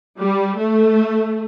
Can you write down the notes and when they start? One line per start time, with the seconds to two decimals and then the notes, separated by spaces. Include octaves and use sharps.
0.20 G3
0.58 A3